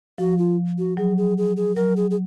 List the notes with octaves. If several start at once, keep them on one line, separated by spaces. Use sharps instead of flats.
F3 F#4
F4
F#4
F#3 G#4
G#4
G#4
G#4
F#3 A#4
G#4
G#4